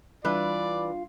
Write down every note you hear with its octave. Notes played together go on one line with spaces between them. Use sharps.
E3 G3 D4 F4 B4 D5 F5